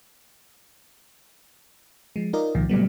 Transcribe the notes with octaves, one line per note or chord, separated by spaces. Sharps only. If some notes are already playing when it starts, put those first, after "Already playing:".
F3 G#3
D#4 F4 A#4 D5 D#5
C2 A#2 D#3 F3
A#2 C#3 F#3 G3 A3 B3